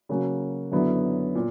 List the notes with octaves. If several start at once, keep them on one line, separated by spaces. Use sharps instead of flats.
C#3 F#3 A#3 C#4 F#4
F#2 D3 F#3 B3 E4
A#2